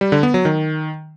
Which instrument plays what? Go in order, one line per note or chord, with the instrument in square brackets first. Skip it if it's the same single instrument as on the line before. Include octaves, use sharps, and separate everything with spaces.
[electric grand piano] G3
D3
B3
F#3
D#3